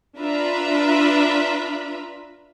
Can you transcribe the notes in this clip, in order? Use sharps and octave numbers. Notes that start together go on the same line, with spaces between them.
D4 F4 B4 E5 A#5 B5